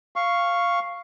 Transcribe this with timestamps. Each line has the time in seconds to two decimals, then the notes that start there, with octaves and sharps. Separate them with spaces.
0.16 F5 C#6